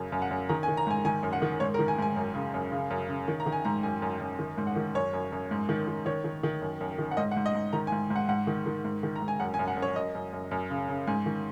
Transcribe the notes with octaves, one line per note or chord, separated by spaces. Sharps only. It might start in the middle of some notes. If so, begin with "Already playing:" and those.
Already playing: F#2 C#3
F#2
F#5
F#2
D#3 A#5
G#5
D#3
A#5
G#2 G#5
D#3 G#5
F#2
F#5
D#3
G#2 C#5
A#4
D#3
G#5
G#2 G#5
F#2
C#3
F#2
C#3
F#2
C#3
D#3
A#5
D#3
G#5
G#2 A#5
F#2 G#5
F#2
F#2
D#3
G#2
F#5
D#3
F#2 C#5
F#2
F#2
G#2
D#3
D#3
D#3 C#5
D#3
D#3
F#2
F#2
D#3
F#5
G#2 D#5
F#5
G#2
D#5
G#2
D#3 A#5
G#5
G#2
G#2
F#5
G#2 F#5
D#3
D#3
G#2
D#3
A#5
G#2
G#5
F#2 F#5
G#5
F#2
F#5
F#2
C#5
F#2 D#5
F#2
F#2
F#2
C#3
C#3
G#2 G#5
D#3